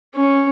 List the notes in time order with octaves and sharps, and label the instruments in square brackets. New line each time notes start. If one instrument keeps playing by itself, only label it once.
[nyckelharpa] C#4